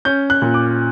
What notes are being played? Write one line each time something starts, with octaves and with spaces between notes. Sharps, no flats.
C#4 G6
F#6
A#2
D6